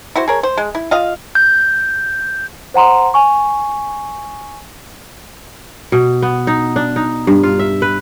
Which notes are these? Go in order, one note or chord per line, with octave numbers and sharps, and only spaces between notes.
E4 F#4 C5
G#4 A#4 C#5
C5
G#3
E4
F4 D#5 F5
G6
C5 F#5 A#5 C6
G#5 C#6
B2
B3
D#4
D4
D#4
G2
F4
E5
B4